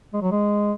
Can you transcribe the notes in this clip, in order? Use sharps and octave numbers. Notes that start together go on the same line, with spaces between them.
G#3
F#3
G#3